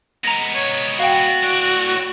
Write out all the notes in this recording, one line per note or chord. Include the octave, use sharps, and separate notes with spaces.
G#3 B3 A#5 A#6
C#5
F#4 F5 G5
A2 D5